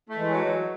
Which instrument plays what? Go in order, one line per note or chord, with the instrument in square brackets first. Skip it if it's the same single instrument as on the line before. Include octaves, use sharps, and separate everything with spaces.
[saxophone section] A3
[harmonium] E3 G#3
[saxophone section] F#3